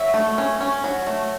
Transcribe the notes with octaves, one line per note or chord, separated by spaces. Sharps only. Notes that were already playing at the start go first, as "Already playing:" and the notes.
Already playing: F#3 E5
A3
C#4
C#4
F#3
A3